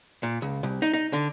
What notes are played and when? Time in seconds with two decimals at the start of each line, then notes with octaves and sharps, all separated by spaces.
0.23 A#2
0.42 C#2
0.63 C2
0.82 D#4
0.93 D#4
1.13 D3